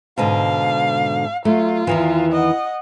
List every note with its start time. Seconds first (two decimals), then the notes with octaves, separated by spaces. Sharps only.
0.18 G#2 B2 D3 F5
1.45 F#3 A3 F4
1.87 E2 D#3 E3
2.32 D#5 F#5